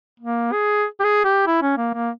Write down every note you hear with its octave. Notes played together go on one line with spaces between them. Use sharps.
A#3
G#4
G4
G#4
G4
E4
C#4
A#3
A#3